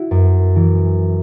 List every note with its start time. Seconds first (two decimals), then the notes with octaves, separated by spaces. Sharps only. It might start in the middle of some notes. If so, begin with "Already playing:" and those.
Already playing: E4 F#4
0.11 F#2
0.56 E3